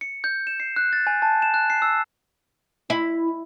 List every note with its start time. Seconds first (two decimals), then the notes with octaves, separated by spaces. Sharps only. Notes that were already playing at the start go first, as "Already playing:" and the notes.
0.01 C#7
0.24 G6
0.47 E7
0.60 C7
0.76 F#6
0.93 A6
1.07 G#5
1.22 A5
1.42 E7
1.54 F#6
1.70 C7
1.82 E6
2.90 E4